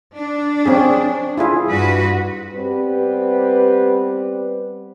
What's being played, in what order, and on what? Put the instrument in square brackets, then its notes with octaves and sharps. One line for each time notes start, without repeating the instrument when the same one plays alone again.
[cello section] D4
[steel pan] C4 C#4 G#4
E4 F4 G#4
[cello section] G2 F#4 B4
[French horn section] G3 B3 C4 G4 B4